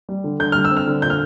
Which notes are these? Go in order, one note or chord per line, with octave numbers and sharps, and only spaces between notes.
G3
D3
D3 G6
G3 F6
E6
C4
F6
D3
A#2 G6
F6